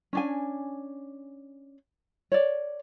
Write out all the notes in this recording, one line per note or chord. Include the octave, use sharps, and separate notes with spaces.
C#4 D4 G#5
C#5 D5